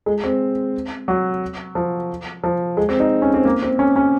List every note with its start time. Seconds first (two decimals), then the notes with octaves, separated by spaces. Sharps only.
0.06 G#3
0.24 C4
1.08 F#3
1.75 F3
2.44 F3
2.77 G#3
2.89 C4
3.00 D#4
3.22 C#4
3.34 C4
3.45 A#3
3.62 C4
3.79 C#4
3.96 C#4